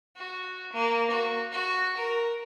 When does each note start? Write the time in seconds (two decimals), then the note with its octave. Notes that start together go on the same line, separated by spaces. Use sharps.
0.17 F#4
0.72 A#3
1.10 F#4
1.52 F#4
1.97 A#4